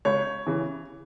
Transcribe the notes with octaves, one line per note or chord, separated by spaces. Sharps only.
C#2 C#5
C#3 E3